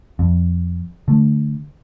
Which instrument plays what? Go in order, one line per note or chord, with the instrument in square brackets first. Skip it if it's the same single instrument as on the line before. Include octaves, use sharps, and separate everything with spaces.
[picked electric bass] F2
D3 A3